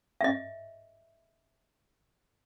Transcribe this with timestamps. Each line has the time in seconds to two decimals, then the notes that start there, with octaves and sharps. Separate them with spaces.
0.21 D#5 E5